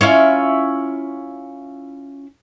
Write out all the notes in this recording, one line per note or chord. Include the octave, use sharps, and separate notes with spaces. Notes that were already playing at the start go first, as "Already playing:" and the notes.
C#4 E4 F4